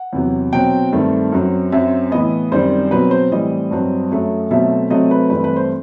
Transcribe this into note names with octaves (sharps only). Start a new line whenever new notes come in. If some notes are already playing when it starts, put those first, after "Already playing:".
Already playing: F#5
E2 C3 F#3
B2 F#3 C4 G5
G2 D#3 A3 C4
F#2 F#3 C4
F#2 F#3 C4 E5
A2 E3 B3 D#5
F#2 D#3 G3 C4 C5
B2 F#3 C4 B4
C5
A2 E3 G3 C4 D#5
G2 F#3 C4
F#2 F#3 A3
B2 F#3 A3 C4 E5
C3 F#3 A3 C4 D#5
B4
G2 E3 A3 C4 B4
B4
C5